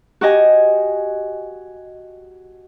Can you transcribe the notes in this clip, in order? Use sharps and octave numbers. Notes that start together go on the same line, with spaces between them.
F#4 G4 D#5 G#5